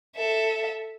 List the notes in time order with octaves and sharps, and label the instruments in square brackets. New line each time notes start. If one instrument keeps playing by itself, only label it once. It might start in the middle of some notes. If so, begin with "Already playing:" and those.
[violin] A4 E5